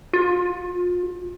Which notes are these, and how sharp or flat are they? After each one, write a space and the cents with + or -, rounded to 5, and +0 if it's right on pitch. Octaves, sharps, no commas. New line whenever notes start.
F4 +35